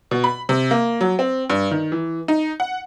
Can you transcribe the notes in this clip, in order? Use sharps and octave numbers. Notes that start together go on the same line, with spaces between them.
B2
B5
C3
A#3
F#3
C4
G2
D#3
E3
D#4
F#5